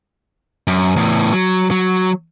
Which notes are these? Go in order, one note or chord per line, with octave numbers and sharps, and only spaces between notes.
F#2
E2 A2
F#3
F#3